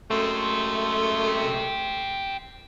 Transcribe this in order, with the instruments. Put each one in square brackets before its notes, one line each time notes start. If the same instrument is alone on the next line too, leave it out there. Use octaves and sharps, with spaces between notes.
[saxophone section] F#2 G#3 A3 [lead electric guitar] G4 C5